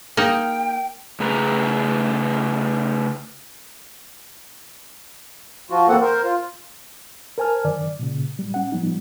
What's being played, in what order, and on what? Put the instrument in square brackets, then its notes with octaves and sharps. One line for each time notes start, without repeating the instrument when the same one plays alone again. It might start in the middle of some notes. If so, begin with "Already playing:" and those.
[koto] A#3 D#4 [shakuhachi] G5
[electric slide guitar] C#3 A3 G#4 B4 A#5
[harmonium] F3 F4 F#4
E2 A#3 C4 A4 F#5
A#4 C5
F4
[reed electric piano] A#4 C5 G#5 A5 F6
F#2 D3 D#3 D5
A#2 C#3
A2 G3
C#4 F#5
A2 F3 G3 B3 D#4